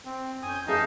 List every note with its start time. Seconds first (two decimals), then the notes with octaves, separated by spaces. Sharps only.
0.05 C4
0.43 F2 C#4 G#5 D#6 G6
0.68 E3 D#4 G#4 E5 F5 A5